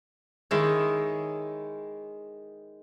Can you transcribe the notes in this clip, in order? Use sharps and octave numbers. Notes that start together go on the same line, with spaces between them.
D#3 G#3 E4 C#5